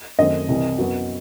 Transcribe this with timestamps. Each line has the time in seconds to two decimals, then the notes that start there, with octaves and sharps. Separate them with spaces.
0.18 F#2 D#3 A3 C4 D#5
0.48 C2 C3 E3
0.78 F#2 F#3 B3